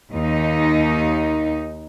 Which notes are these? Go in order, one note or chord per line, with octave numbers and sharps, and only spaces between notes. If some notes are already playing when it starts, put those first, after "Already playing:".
D#2 D#4